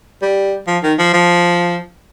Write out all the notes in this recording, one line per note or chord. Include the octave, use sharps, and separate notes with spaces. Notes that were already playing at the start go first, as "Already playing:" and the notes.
G3
F3
D#3
F3
F3